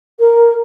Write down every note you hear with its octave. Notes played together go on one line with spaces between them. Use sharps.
A#4